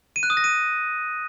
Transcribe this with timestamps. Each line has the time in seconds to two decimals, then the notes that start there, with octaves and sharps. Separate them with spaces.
0.16 D#7
0.23 F#6
0.30 D#6
0.37 A#6
0.44 D#7